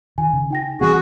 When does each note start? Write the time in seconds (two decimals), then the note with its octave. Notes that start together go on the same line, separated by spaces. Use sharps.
0.18 D#3 G#5
0.33 C#3
0.50 D#4 G5 A#6
0.81 E3 G3 C4 F#4 G#4 F#5